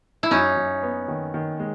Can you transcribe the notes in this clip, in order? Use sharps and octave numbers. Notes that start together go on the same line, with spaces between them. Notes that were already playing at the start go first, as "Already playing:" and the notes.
E4
F#2 C#4 D#4
F#2
B3
D#3
D#3
G#3